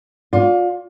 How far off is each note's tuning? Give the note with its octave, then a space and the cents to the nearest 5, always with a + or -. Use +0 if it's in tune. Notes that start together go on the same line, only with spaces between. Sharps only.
F4 +30 D5 -25